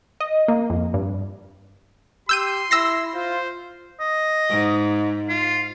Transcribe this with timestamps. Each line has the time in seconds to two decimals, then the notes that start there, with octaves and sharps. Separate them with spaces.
0.20 D#5
0.48 A#3
0.70 F2
0.94 G2
2.29 G4 C6 E6 G6 D#7
2.71 E4 E6 A#6 C7
3.15 F4 C5
4.00 D#5
4.50 G#2
5.29 F4